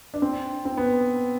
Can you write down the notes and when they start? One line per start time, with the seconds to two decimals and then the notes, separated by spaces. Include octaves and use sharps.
0.14 D4
0.22 C4
0.65 C4
0.77 B3